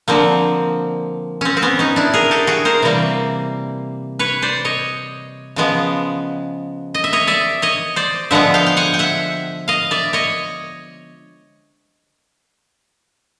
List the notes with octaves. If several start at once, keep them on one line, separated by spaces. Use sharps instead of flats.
D3 F3 A#3 C4
C4 C#4
C4
B3 C#4
C#4 D#4
D4 E4
G#4 A#4
G4 A4
F#4 G#4
A#4 C5
C3 E3 G3 A#3
B4 C#5
C5 D5
C#5 D#5
C#3 F3 G#3 B3
D#5
E5
C#5 D#5
D5 E5
C#5 D#5
C5 D5
D3 F3 G#3 B3 E5 F#5
F5 G5
G5
F#5 G#5
G5
E5 F#5
D#5 F5
D5 E5
C#5 D#5